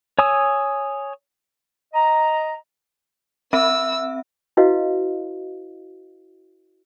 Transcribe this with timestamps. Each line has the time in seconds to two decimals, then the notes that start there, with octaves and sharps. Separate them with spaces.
0.19 C#5 G#5 D#6 E6
1.94 D#5 A#5
3.53 C4 E5 E6
4.57 E4 F#4 B4 D#5 F5